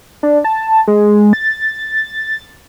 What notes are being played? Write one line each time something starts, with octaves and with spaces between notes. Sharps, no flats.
D4
A5
G#3
A6